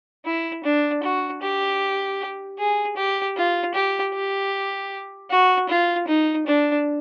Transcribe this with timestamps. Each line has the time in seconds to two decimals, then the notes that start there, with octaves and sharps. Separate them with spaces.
0.25 E4
0.64 D4
1.03 F#4
1.42 G4
2.59 G#4
2.97 G4
3.36 F4
3.74 G4
4.14 G4
5.30 F#4
5.69 F4
6.08 D#4
6.47 D4